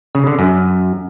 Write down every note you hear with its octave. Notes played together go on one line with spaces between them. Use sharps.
C#3
D3
F#2